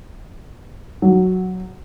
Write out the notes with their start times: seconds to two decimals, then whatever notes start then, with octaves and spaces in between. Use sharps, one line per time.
1.02 F#3